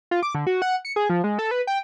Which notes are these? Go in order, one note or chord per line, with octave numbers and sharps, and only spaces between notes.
F4
D6
D3
F#4
F#5
C#7
G#4
F3
G#3
A4
B4
G5